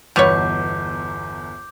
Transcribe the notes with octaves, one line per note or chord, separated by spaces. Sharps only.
G1 E2 B2 B4 C#5 D6 G6 F7